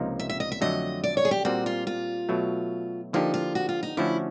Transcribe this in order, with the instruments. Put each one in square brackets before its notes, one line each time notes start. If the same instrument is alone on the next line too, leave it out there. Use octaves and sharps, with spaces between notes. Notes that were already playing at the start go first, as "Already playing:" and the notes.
Already playing: [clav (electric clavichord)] C#2 C3 F3 A#3 D#4
[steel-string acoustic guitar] E5
E5
D#5
E5
[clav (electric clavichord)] F2 D3 F#3 A3 [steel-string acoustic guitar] D#5
[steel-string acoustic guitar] D5
C#5
G#4
G4
[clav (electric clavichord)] A#2 G3 C4 [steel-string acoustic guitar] F#4
[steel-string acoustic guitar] F4
F4
[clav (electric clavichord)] B2 F#3 A3
[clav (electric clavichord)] D3 F3 A#3 D4 G4 [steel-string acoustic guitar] D#4
[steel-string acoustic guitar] F4
F#4
F4
D#4
[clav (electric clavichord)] D3 F3 A3 C#4 F#4 [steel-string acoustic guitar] E4